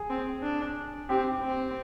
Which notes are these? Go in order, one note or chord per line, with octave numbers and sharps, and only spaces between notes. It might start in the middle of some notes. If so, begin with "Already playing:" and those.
Already playing: G#4
C4
D4
C4 G4
C4